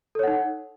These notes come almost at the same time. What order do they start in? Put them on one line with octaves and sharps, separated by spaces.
A4 C#5 F#5 D#4